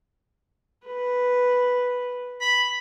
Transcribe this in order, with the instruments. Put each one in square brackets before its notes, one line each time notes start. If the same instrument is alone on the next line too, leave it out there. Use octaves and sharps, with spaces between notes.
[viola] B4
[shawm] B5